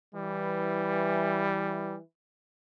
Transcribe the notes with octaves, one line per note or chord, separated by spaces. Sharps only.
E3 G3